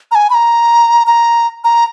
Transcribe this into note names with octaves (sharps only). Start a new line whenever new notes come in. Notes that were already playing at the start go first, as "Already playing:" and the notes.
A#5
G#5
B5
A#5
A#5
A#5